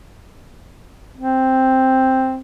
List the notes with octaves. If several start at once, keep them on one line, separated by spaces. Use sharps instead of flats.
C4